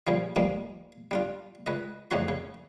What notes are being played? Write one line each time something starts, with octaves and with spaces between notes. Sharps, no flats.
A#1 C#3 F3 G3
G#2 F3 G3 G#3 A#3
G3 D4 F4
C#2 B4 D#5
F2 A2 C#3 F3 F#4 C6
C#3